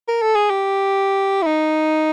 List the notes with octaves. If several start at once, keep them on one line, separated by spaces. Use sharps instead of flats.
A#4
A4
G#4
G4
E4
D#4